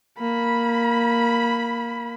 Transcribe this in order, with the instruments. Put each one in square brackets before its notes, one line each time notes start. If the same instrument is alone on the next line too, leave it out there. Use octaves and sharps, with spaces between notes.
[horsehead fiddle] A#3 B5